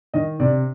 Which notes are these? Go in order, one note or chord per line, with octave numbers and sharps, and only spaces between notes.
D#3 D#5
C3 D5